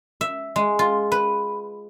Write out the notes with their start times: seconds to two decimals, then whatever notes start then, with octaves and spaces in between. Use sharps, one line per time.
0.21 E5
0.56 G#3
0.79 F4
1.12 B4